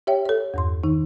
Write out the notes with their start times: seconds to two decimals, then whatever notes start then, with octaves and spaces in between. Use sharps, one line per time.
0.07 G4 C#5 E5 G5
0.26 A4 C#5
0.54 E2 G2 C6
0.84 D#3 D#4